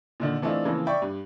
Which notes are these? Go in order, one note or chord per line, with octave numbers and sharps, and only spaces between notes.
A#2 D3 D#3
E3 A3 C4 D4 D#4 F4
C#3 E3 F3 A#3 C4
D5 E5 G5 B5 C#6
G2